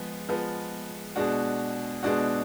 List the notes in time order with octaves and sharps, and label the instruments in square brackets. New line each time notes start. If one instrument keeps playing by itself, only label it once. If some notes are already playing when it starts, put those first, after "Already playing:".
Already playing: [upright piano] F3 G#3 B3
F3 G#3 B3
B2 G#3 D4 F#4
B2 G#3 D4 F#4